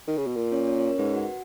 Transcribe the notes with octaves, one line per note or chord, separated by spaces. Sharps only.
D#3
C#3
B2
A#2 A#4
C#4 C#5
C#4 C#5
C#4 C#5
A#4
G#2 B4
F#4 F#5